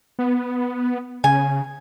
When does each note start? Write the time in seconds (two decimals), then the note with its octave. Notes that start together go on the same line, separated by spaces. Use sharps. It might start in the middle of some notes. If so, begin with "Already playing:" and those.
0.19 B3
1.24 C#3 G#5